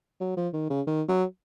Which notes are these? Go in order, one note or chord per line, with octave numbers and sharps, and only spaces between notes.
F#3
F3
D#3
C#3
D#3
F#3